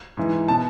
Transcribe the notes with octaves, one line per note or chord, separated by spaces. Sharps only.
G#2 E3
B2 A5